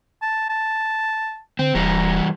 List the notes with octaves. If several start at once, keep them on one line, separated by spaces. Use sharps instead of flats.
A5
A5
D3 C4
D#1 E3 G3 A#5